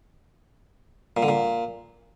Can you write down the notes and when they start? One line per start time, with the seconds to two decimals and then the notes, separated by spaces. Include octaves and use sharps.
1.17 A#2
1.23 D3
1.28 A#2